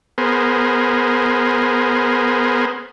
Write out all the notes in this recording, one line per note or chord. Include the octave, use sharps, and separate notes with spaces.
B3 G#4 A#4 C5